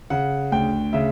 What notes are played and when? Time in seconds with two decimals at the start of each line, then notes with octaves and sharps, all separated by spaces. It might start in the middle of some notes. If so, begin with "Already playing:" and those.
0.10 C#3 F#5
0.52 D2 G5
0.93 C#3 E5